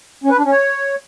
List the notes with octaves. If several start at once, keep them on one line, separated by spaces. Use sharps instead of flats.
C#4
B4
D4
C#4
C#5